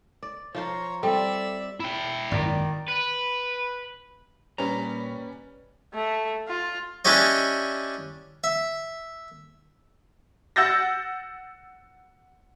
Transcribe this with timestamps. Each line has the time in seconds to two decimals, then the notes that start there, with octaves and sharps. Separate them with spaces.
0.23 D5
0.55 F3 F4 C5 C#5 A#5
1.03 G3 C4 A4 D5 E5 G5
1.80 E4 G5
2.31 G#1 F#2 A#2 D#3 D5
2.88 B4
4.58 A#2 G3 C#4 B4 A#5
5.94 A3
6.48 F4
7.05 C#4 D4 E4 G4 C#5 D#5
8.44 E5
10.56 F#5 E6 G6 A6 A#6